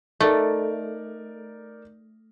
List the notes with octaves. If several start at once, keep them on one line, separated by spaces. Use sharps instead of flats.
A3 D#4 A#4 D5